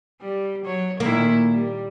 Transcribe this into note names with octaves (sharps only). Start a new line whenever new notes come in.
G3
F#3 C#5
A#2 D#3 A#3 E4
G3